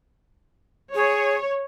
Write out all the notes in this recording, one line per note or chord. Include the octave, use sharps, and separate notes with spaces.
G#4 C#5